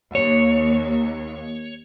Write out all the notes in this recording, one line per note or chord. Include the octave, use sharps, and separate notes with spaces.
D#2 C#5